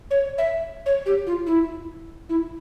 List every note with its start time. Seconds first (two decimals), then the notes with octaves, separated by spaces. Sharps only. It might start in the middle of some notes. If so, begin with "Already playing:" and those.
0.11 C#5
0.38 E5
0.86 C#5
1.06 G4
1.27 F4
1.47 E4
2.29 E4